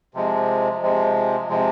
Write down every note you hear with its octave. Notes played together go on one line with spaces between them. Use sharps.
C3 F3 G#3
C3 F3 G#3
C3 F3 G#3